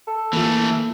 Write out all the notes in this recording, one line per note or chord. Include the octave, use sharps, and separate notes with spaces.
A4
E3 A3 A#3 F4